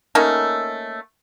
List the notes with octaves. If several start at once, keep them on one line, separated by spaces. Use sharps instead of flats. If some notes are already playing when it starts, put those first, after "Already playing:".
A3 A#3 C#4 D#4